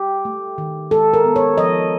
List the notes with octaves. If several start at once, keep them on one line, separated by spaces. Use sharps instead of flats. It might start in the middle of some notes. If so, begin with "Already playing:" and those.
Already playing: G4
A3
D#3
G#3 A4
A#4
B3
C#5
F3 D#5